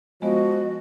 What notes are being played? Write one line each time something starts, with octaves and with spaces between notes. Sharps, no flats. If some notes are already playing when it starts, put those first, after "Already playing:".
F3 G#3 B3 F#4 D#5